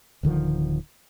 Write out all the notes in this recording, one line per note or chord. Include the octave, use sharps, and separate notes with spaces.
D1 D3 D#3 F3